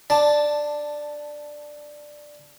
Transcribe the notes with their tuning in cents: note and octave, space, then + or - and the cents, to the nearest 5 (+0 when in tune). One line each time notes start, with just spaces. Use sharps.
D4 +10 A5 +0